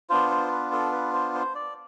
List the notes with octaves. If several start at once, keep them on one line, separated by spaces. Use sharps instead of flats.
B3 D4 F4 C5
C5
B4
A4
B4
C5
C5
D5